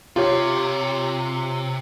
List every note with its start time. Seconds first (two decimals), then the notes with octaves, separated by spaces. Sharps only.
0.16 C3 F4 G4 C#5